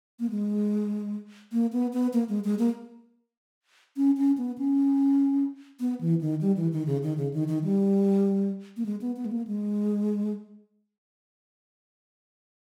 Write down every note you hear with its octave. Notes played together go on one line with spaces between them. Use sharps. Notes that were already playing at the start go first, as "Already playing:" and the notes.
A#3
G#3
A#3
B3
B3
A#3
G#3
G#3
A#3
C#4
C#4
B3
C#4
B3
E3
D#3
G3
E3
D#3
C#3
D#3
C#3
D#3
D#3
G3
A#3
G#3
B3
B3
G#3
A#3
G#3